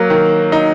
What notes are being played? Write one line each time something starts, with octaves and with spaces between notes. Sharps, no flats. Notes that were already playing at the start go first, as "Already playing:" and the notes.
Already playing: F#3 A#3
D#3
D#4